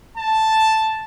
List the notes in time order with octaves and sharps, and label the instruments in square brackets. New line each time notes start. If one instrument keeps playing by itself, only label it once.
[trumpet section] A5